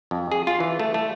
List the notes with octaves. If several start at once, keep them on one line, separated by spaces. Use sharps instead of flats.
F2
G#4
F4
E3
A3
A3